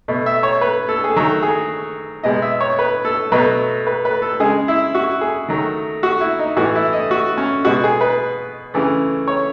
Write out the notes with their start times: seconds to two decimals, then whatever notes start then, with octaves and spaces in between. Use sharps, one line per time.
0.08 B2 A3
0.26 E5
0.43 C#5
0.61 B4
0.89 A4
1.04 G#4
1.16 D#3 F#3 A3 A4
1.42 G#4
2.24 B2 G#3 D#5
2.42 E5
2.60 C#5
2.79 B4
3.05 A4
3.32 B2 F#3 A3 B4
3.87 B4
4.05 B4
4.22 A4
4.40 C#3 G#3 G#4
4.68 E4
4.95 F#4
5.21 G#4
5.48 D#3 F#3 A3
6.03 F#4
6.21 E4
6.39 D#4
6.57 A2 E3 A3 F#4
6.75 E4
6.93 D#5
7.11 F#4
7.38 C#4
7.65 B2 G#3 F#4
7.84 G#4
8.01 B4
8.74 C#3 E3 A3
9.28 C#5